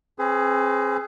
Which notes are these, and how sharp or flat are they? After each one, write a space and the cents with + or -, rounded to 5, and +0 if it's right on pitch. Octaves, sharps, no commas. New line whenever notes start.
C4 +40 G#4 +10 B4 +45